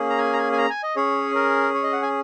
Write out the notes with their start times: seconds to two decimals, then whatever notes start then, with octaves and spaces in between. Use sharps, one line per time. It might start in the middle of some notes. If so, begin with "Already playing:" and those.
Already playing: A#3 C#4 G#4
0.10 A#5
0.18 G#5
0.33 A#5
0.38 G#5
0.52 G#5
0.58 A#5
0.70 G#5
0.83 D#5
0.96 C#4 G#4 C#5
1.35 A#4
1.74 C#5
1.83 D#5
1.93 F#5
2.02 G#5